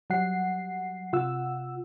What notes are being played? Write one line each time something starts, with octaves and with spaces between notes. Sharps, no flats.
F#3 G3 F#5 C7
C3 F4 F#5 E6